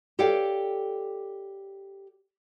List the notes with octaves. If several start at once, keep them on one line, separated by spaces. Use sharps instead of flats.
G4 A4 C#5 D5 F5 G5